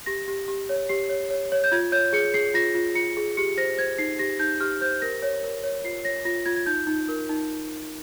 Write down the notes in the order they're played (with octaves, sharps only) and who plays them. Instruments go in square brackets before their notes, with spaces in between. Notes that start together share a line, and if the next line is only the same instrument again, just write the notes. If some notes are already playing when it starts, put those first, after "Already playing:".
[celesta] G4 A#6
G4
G4
C#5
G4 C7
C#5
C#5
C#5
G6
F4 G#6
C#5 G6
G#4 C#7
G#4 C7
F4 A#6
F4
F4 C#7
G#4
G4 C#7
C5 A#6
C5 G#6
D#4 C7
G4 A#6
D#4 G6
G4 F6
C5 G6
A#4 A#6
C#5
A#4
C#5
F4 C7
C#5 A#6
F4 A#6
F4 G#6
G#6
D#4 G6
D#4
A#4
D#4